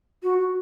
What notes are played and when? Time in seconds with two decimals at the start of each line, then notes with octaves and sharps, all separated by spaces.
0.23 F#4
0.38 F#4